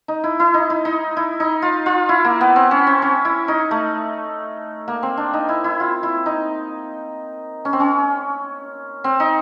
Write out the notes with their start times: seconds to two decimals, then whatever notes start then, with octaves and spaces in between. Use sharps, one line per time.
0.08 D#4
0.24 E4
0.40 E4
0.54 D#4
0.70 E4
0.85 D#4
1.17 E4
1.40 D#4
1.62 F4
1.86 F4
2.09 E4
2.25 A#3
2.41 B3
2.56 C4
2.71 C#4
2.87 C4
3.02 C#4
3.25 E4
3.48 D#4
3.71 A3
4.88 A#3
5.03 C4
5.17 D4
5.34 D#4
5.49 E4
5.64 E4
5.80 F4
6.03 E4
6.26 D#4
7.65 C#4
7.73 C4
7.80 C#4
9.04 C4
9.20 D#4